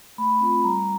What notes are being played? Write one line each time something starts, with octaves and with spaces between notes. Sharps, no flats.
A3 B5
C4 F4
G3 A#5